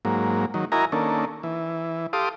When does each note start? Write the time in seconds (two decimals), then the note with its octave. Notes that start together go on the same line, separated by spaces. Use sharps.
0.05 G#2 F#3 A#3
0.54 D#3 F#3
0.72 E4 F#4 A#4 D#5 G#5 A#5
0.92 D#3 A#3 C#4 D4 A4
1.43 E3
2.13 G4 A4 F5 C6 D6 D#6